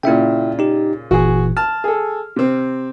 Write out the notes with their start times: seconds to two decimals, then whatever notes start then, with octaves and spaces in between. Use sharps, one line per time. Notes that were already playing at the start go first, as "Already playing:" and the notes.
0.03 A#2 C#3 E4 E5 G5
0.59 D#4 G4
1.11 G1 A#2 E3 F#4 G#4
1.57 A5 F6
1.84 G#4 A4
2.36 C3 C4